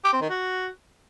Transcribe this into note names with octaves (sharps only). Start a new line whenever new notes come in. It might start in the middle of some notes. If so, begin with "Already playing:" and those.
G4
C4
D#3
F#4